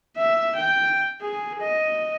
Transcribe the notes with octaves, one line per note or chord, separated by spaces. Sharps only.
E5
G5
G#4
D#5